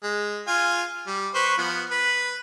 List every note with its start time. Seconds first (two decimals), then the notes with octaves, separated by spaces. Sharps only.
0.03 G#3
0.47 F4 G#5
1.07 G3
1.35 B4 C5 C#6
1.58 F3 B3
1.91 B4